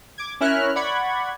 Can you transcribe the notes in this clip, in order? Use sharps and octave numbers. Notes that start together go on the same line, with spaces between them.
D6 G#6
C#4 E4 A#4 F6 F#6
D5 F#5 B5 C#6 G#6